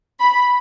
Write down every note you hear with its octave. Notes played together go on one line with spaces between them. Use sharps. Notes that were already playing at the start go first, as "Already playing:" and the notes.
B5